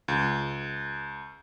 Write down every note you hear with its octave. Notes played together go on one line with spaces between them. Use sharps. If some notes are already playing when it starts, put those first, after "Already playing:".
C#2